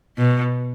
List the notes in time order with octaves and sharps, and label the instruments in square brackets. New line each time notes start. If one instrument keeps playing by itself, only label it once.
[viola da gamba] B2